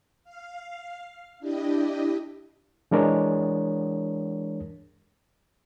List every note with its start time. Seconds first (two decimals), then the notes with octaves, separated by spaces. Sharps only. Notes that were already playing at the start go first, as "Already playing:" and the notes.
0.24 F5
1.39 D4 E4 G4 D#5
2.91 E3 G#3 D4 A#4 C#5